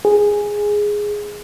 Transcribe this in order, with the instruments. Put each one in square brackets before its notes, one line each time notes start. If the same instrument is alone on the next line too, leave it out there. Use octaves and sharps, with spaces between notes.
[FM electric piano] G#4